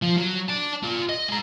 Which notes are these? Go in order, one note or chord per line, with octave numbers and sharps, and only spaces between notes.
F3
F#3
D5 A5
F4 D5
D#5
G#3 A#5